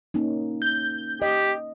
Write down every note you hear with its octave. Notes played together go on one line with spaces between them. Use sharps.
A#3 C#4 D#4
G6
G4 D#5